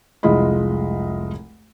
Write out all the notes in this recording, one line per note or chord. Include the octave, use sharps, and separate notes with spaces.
F1 C2 G#3 F4 D#5 B5